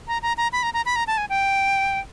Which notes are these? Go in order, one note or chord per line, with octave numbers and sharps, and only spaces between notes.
A#5
A#5
A#5
B5
A#5
A#5
B5
A#5
A5
G#5
G5